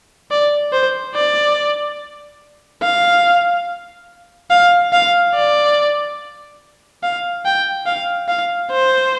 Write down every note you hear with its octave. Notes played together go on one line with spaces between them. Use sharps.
D5
C5
D5
F5
F5
F5
D5
F5
G5
F5
F5
C5